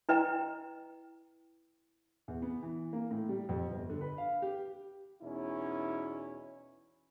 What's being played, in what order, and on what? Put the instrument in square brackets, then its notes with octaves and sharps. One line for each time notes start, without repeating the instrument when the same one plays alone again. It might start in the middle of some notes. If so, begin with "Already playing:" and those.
[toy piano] E4 B4 D#5 G5 A#5
[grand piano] E2
B3
E3
A#3
A2
G3
F2
G1
D3
B4
F5
G4
[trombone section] E2 B2 C#4 D#4 E4